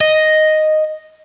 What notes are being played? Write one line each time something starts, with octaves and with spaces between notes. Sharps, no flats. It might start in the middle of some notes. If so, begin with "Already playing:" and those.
D#5